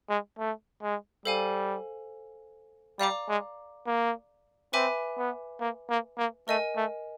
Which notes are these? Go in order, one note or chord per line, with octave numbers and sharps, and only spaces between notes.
G#3
A3
G#3
G3 A4 C5 F5 G#5
G3 D5 F5 A#5 D6
G#3
A#3
C4 B4 E5 G#5 B5 D6
B3
A#3
A#3
A#3
A3 A#4 D#5 G#5
A3